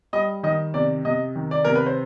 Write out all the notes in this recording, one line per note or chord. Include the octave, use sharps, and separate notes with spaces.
G3 D#5
D#3 D#5
C3 D5
C3 D#5
D#3
D5
C3 A#4
B4
C5